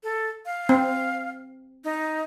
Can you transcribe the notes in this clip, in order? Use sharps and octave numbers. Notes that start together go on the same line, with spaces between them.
A4
F5
C4
D#4